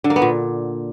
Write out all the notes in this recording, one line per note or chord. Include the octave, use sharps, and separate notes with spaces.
D3
A#3
B3
A#2